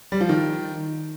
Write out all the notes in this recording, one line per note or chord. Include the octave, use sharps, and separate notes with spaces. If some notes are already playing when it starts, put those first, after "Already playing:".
G3
F3
D#3